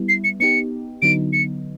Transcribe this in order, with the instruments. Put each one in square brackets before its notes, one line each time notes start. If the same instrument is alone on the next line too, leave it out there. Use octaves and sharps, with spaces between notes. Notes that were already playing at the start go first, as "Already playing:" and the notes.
Already playing: [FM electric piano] G3 B3 E4
[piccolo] C7
C#7
[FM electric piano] B3 D#4 G4 [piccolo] C#7
[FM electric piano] D3 F#3 B3 D#4 [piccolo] D7
[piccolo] C#7